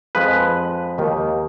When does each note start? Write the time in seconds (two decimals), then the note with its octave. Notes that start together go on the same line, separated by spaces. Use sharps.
0.15 F2 F3 G#3 B4
0.98 D#2 D#3 A#3